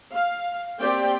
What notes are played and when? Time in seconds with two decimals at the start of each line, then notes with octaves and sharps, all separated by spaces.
0.13 F5
0.79 A#3 C4 G4 D5 G5